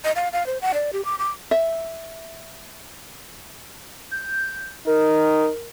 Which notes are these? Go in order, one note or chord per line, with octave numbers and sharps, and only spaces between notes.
D#5
F5
F5
C5
F#5
D5
G4
D6
D6
E5
G6
D#4 A#4